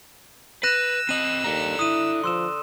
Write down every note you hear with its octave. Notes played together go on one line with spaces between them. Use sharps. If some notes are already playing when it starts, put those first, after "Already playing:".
B4 E6 F#6 A#6 D#7
C4 D#5 D#7 F#7
D#2 A4 D5 A#5
E4 D#6 D#7
F3 C6 E6 E7